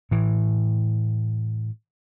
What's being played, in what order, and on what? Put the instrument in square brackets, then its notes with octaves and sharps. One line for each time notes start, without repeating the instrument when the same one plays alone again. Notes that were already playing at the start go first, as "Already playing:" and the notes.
[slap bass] A2 E3